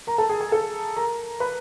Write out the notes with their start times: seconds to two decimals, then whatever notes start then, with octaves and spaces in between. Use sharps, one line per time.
0.07 A#4 A#5
0.18 A4 A5
0.29 G#4 G#5
0.41 G#4 G#5
0.52 A4 A5
0.96 A#4 A#5
1.40 B4 B5